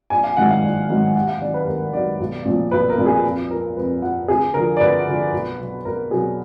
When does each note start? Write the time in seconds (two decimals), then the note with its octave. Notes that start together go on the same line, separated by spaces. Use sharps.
0.10 A#1 G#5
0.24 F5
0.37 G#2 D#3 F#3 F#5
0.51 F5
0.63 A#1
0.89 G#2 D#3 F#3
1.15 D#2 F#5
1.28 F5
1.41 D#3 F#3 D5
1.54 B4
1.67 D#2 A#4
1.93 D#3 F#3 D5
2.20 B1
2.45 A#2 F3
2.71 B1 B4
2.89 A#4
2.98 A#2 F3
3.06 G#4
3.24 F2
3.50 F3 A#4
3.76 F2 B4
4.02 F3 F#5
4.28 D2 G#4
4.54 D3 F3 A#4
4.77 D5
4.80 D2 B4
5.07 D3 F3
5.33 B1
5.59 B2 F#3
5.85 B1 A#4
6.11 B2 F#3 G#4